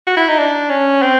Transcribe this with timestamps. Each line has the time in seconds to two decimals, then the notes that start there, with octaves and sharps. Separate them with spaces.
0.07 F#4
0.17 E4
0.28 D#4
0.38 D4
0.70 C#4
1.02 C4